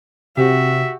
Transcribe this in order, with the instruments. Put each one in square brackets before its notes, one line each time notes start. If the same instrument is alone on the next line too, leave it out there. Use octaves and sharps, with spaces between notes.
[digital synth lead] C3 [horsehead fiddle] F#4 [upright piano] G4 [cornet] E5